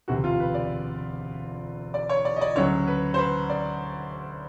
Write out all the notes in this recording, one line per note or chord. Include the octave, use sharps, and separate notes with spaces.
E1 D2 C3 F#4
F4
B4
D5
D5
C#5
D5
D#5
D5
D2 C#3 F#3 C#5
B4
C5
B4
D5